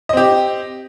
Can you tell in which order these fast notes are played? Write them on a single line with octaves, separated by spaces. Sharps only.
D#5 C4 G4